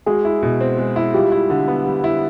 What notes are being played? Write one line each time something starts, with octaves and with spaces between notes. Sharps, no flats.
G#3 F#4 G#4
E4
B2
C4
G#3
E4
G3 F4 G4
E4
D3
B3
G3
E4